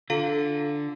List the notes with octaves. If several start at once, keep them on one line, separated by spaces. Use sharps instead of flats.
D3 F4 A4 F5